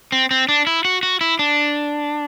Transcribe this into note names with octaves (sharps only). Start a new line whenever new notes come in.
C4
C4
D4
E4
F#4
F#4
E4
D4